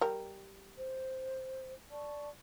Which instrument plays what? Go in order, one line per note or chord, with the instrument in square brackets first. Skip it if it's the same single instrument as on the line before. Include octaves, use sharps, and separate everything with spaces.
[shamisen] G3 A#4
[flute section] C5
D5 A5 C#6